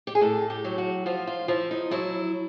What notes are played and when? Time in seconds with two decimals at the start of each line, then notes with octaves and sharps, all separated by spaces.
0.07 G4
0.15 G#4
0.21 A2 A4
0.50 G4
0.65 F#3
0.78 F#4
1.06 F3 F4
1.27 F4
1.48 F3 E4
1.71 D#4
1.91 F#3 E4